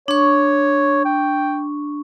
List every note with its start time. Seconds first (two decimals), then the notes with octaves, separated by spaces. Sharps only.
0.08 D4 C#5 C#6
1.05 G5